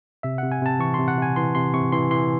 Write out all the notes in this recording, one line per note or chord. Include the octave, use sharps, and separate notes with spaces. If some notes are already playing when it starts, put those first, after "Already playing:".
C3 E5
C3 F#5
G#5
C3 A5
E3 C#6
C3 C6
F#5
C3 G#5
E3 C6
C3 C6
C3 C#6
E3 C6
E3 C6